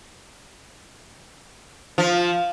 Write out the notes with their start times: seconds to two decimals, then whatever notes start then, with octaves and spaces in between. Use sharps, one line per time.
1.98 F3